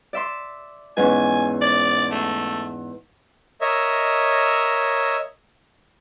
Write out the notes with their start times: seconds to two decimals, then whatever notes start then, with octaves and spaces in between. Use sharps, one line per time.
0.13 D5 E5 C6
0.97 E2 G#2 C#4 G#5
1.61 D5
2.11 A3
3.61 A#4 C#5 D#5 E5